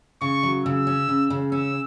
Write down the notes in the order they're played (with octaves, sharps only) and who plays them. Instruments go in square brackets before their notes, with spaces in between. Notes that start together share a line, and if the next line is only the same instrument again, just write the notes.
[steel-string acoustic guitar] C#3 [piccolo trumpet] C#6
[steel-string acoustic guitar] F#3
[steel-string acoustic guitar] C#3 [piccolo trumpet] E6
[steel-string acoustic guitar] C#4
C#3
C#3
[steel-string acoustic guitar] C#4 [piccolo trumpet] E6